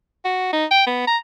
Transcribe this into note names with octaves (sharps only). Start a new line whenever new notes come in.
F#4
D#4
G5
B3
A#5